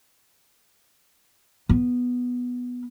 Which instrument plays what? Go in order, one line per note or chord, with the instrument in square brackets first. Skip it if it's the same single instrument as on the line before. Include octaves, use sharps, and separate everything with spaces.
[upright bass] B3